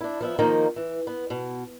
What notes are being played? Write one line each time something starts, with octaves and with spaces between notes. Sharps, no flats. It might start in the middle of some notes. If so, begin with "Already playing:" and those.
D4 E4
F3 B3 E5
D#3 F3 A#3 D#4
E3
B3
B2